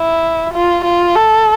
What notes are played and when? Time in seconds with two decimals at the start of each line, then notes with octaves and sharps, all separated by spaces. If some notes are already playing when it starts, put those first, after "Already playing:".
Already playing: E4
0.54 F4
0.84 F4
1.15 A4